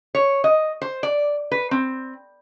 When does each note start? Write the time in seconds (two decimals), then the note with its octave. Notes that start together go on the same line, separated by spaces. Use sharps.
0.15 C#5
0.44 D#5
0.82 C5
1.03 D5
1.52 B4
1.71 C4